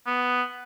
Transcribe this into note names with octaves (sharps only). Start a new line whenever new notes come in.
B3